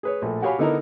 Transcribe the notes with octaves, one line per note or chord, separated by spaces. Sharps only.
G#4 B4 C#5
A#1 A2 A3
F#4 G4 C#5 F5 G#5 B5
D3 B3 D#4 E4 A#4